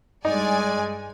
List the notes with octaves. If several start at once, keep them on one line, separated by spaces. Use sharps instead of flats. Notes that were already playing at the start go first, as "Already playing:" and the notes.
G2 G#3 D#4 D5 G#5